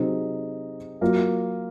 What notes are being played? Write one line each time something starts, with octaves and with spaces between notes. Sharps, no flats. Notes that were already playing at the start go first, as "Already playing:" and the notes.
Already playing: C3 F#3 C4 D#4 G#4
F#3 A#3 F4 A#4